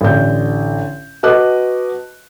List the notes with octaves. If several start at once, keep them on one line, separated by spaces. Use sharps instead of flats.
A1 D3 G6
F#4 B4 D#5 A5 D6 F#6